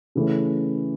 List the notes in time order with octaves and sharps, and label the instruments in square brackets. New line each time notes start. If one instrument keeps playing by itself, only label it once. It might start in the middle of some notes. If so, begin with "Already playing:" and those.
[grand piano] C#3 E3 A3 C#4